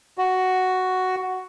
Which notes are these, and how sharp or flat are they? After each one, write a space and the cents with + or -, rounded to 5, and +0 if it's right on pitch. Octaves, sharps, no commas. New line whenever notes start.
F#4 +5